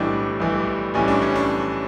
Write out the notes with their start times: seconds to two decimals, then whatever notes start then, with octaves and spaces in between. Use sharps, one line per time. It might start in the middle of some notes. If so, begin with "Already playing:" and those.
Already playing: B1 A2 E3 G3 D4
0.40 B1 A2 E3 G3
0.94 B1 A2 E3 G3 C#4
1.08 D4
1.22 C#4
1.36 D4